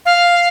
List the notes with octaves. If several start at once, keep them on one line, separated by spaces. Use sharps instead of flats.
F5